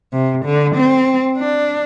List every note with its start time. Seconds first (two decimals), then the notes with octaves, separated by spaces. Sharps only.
0.13 C3
0.44 D3
0.75 C4
1.38 D4